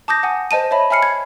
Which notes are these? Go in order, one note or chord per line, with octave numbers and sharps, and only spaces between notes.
A5 D6 D#6 G6 A#6
F#5 G#5 D#6
C5 D#5 A5 D#7
C#5 D#5 E5 A5 B5
E5 G#5 B5 F6 C7 C#7
G#6